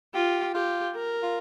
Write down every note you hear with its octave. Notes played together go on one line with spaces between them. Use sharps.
F4 G4
F4 G4
A#4
F4